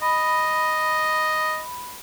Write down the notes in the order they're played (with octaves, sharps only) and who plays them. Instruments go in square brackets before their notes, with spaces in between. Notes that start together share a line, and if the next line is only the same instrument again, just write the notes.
[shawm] D#5 [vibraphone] B5